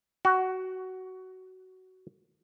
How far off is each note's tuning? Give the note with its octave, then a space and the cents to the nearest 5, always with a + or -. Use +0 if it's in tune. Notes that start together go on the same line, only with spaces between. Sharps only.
F#4 +15